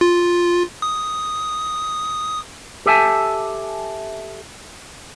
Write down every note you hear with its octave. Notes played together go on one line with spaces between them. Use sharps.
F4
D#6
G4 A4 E5 G#5 A5